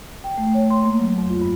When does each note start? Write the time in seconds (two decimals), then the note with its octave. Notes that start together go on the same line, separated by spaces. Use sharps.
0.24 G5
0.38 A3
0.54 C#5
0.70 C6
0.84 A#3
1.00 F#3
1.18 F2
1.29 F4
1.42 G2